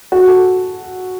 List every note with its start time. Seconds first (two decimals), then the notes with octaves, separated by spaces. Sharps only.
0.12 F#4
0.28 A4